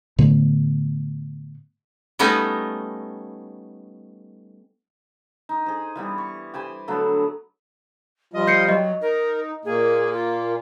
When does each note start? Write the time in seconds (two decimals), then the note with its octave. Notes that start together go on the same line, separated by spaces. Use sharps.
0.19 A2 D3 A3 B3
2.19 G3 A3 B3 C#4 D#4
5.49 D#4
5.66 G#4 C5
5.96 E3 G3 B3
6.18 C#6
6.54 G4 C5 G#5 B5
6.88 D3 F#3 A3 B3
8.33 F3 G3 F4 D#5
8.47 G6 C7 C#7
8.69 F#3 D#5
9.01 D#4 A#4
9.65 A#2 A#3 G#4
10.13 F4